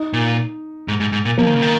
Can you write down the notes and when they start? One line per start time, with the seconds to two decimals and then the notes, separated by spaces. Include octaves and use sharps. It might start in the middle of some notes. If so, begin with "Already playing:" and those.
Already playing: D#4
0.13 A#2
0.88 G#2
1.00 G#2
1.12 G#2
1.25 A#2
1.38 F3 A#3
1.47 D#3
1.54 C#3
1.62 D#3